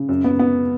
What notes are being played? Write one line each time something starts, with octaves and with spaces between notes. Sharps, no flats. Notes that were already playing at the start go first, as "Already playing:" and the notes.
Already playing: C#3
F#2
B3
B3